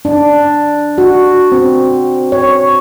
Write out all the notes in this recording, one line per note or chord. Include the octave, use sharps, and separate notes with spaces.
D4
F#4
C4
C#5